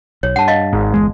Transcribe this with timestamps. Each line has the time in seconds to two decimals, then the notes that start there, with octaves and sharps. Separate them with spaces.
0.23 B1 C#5
0.36 G2 F#5 A5
0.48 D#5 F5
0.73 G#1 G#2
0.94 G1 E2 G#3